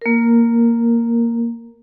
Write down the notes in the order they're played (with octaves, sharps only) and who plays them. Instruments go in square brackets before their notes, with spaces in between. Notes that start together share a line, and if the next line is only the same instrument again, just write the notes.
[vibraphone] A#3 A#4